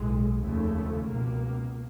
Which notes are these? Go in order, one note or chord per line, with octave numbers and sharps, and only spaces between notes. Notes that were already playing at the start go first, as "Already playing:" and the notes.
Already playing: B1 A2 G#3
F1 D#2 C#3 A3
C#2 B2 A#3